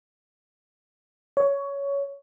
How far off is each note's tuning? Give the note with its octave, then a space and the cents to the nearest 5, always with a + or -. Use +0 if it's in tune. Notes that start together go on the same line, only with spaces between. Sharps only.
C#5 +15